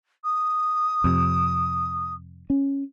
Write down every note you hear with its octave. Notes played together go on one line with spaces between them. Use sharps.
D#6
F2 C3
C#4